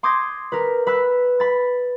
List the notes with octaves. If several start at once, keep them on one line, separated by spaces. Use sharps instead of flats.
C6 D6 D#6 G6 G#6 A#6
A#4 B4
B4 B5 E6 F#6
B5 A6